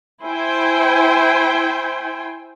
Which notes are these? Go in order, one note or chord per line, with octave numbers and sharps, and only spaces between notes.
E4 C5 G5 G#5